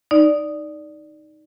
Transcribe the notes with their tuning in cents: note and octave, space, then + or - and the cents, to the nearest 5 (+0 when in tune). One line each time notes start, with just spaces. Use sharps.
D#4 +0 D5 +0